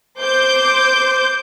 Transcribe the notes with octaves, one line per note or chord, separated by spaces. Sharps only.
C5 D6 G6